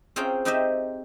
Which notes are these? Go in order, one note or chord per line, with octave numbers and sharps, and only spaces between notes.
C4 C#4 F4 G#4 G5 A#5
C4 D#4 G4 C5 D#5 E5